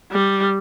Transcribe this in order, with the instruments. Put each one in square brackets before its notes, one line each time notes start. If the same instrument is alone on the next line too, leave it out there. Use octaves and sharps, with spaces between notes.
[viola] G3